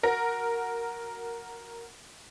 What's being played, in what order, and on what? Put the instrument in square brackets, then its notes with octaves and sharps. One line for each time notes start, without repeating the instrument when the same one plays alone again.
[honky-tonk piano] F#4 A#4 A#6